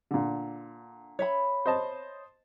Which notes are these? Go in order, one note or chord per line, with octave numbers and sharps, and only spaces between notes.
A#2 D3
C#5 E5 B5
C5 D#5 A5